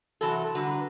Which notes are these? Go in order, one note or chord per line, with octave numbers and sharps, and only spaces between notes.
C3 E3 F#3 F#4 A4
D3 G3 F#4 B4 A#5